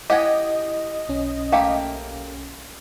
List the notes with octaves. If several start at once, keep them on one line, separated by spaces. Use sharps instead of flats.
E4 G4 D#5 F#5 G#5
B1 C#4
A3 A#3 G4 F5 G5